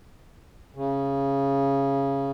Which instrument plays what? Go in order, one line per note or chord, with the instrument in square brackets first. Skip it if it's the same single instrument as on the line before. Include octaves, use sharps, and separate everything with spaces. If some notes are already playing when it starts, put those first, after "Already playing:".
[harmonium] C#3